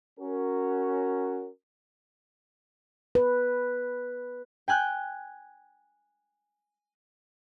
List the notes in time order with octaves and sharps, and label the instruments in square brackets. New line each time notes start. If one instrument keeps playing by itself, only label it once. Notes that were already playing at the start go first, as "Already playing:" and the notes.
[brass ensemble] C#4 F#4 A#4
[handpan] B4
[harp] G5 G#5 F#6 G6